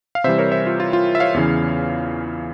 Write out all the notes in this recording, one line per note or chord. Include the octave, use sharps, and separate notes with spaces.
F5
C3 E3 G3 C5 E5
A#4 C#5
C5 E5
F4
F4
F4
E5
C#5 F5
E2 C#3 E3